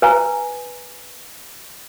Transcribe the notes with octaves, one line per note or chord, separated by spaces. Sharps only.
B4 G#5 A#5